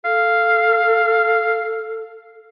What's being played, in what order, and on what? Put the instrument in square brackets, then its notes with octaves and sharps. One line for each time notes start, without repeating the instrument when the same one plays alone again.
[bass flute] A4 [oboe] F5